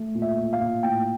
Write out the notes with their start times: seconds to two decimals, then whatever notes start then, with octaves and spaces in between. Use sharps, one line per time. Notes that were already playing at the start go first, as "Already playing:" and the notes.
Already playing: A3
0.15 A#2
0.22 E5
0.37 A#2
0.53 F5
0.60 A#2
0.83 A2 G5